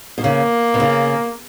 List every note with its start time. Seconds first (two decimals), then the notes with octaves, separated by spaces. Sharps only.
0.18 B2
0.23 C#3 A#3
0.74 B2
0.80 C#3